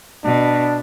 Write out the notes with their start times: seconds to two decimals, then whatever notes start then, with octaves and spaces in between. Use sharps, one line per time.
0.24 B2 D4